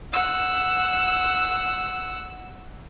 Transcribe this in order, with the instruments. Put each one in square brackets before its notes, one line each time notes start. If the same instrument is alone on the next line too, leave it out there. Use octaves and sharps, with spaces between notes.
[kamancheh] F#5 E6